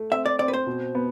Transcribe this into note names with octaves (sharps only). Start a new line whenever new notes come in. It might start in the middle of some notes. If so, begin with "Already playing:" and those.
Already playing: A3
C4 E5
D5
C4 D5
B4
C5
B2
B3